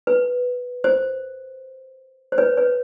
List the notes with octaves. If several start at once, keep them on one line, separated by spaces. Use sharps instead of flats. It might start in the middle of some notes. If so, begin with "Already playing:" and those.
B4
C5
C5
B4 C#5
B4 C#5